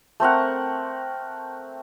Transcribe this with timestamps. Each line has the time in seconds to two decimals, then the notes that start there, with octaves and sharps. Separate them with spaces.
0.20 A3 C4 A#4 F#5